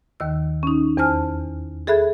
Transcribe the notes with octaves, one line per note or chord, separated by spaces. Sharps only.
D#2 D#3 E6
C#4 D#4
E2 C5 G#5 A5 F6
G#4 A4 E5 B5 F#6 G#6